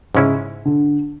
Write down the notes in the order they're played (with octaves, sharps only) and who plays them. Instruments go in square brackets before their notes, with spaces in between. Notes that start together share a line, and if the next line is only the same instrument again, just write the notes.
[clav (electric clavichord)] G#2 G#3 C#4 E4 [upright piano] C#3
[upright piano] D3